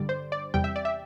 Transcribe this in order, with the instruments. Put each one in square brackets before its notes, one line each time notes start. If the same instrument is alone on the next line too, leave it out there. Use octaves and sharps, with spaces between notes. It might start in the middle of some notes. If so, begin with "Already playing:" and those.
Already playing: [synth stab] G1 G2 D3 G3 D5
C5
D5
E2 C3 G3 G5
E5
D5
E5